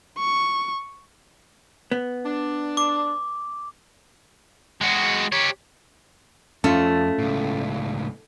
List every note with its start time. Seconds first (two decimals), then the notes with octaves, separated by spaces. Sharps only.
0.19 C#6
1.91 B3
2.24 D4
2.77 D6
4.81 G#3 F#4
5.32 G4 C#5
6.64 F2 A3 C#4 F4
7.19 C#2 A2